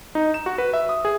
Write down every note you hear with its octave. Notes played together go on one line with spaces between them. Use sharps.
D#4
E7
F#4
B4
E5
D#6
G#4